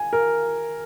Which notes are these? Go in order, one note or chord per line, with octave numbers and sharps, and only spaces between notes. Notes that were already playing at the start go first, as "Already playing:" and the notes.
Already playing: G#5
A#4